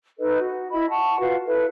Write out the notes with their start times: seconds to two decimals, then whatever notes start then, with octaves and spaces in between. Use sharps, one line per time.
0.19 D#4 A4 B4 D#5
0.38 F#4
0.72 E4 D#5 B5
0.89 F#5 A5 C#6
1.20 F4 F#4 B4 F5
1.46 E4 A4 B4 E5